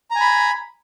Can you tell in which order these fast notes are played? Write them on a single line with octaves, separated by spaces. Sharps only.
A#5 G#5 B5